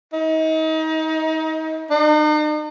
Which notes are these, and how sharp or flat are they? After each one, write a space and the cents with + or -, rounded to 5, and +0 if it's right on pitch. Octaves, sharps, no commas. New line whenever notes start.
D#4 +30
D#4 -45